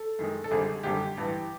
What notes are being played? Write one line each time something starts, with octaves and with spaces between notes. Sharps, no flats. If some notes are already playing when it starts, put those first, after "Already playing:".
Already playing: A4
F#2 D#3 G#3
A4
G#1 F#2 D3 G3 G#4
G#1 F#2 D3 G3 G4
A1 G2 E3